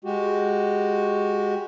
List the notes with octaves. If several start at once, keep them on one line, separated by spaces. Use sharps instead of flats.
G#3 F#4 G4